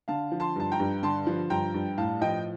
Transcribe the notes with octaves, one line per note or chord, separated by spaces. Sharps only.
D3 F5 A5
F3
A5 C6
G2 A5
G5 A#5
G2
D3 A5 C6
F3
G2 G5 A#5
G2
A2 F5 A5
F3 D#5 G5